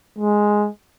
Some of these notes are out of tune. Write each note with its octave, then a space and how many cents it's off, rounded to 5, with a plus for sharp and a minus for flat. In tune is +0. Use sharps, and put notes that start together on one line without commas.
G#3 +0